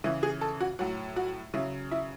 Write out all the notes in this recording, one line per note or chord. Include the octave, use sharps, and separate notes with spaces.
C#3 E3 E4
G#4
A4
F#4
A2 F#3 F#4
F#4
C#3 F#3 E4
E4